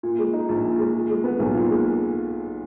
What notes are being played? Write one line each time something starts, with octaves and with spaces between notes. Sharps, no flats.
A#2
G#3
D#4
A#1
A#2
G#3
A#2
G#3
B3
B1
A#2
G#3